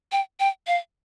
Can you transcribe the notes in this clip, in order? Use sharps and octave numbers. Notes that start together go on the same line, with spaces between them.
G5
G5
F5